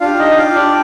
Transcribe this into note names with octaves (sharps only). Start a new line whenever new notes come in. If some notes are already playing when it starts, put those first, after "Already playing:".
D4 F4 G4 F5
D#4 D#5
F4 F5
D4 D5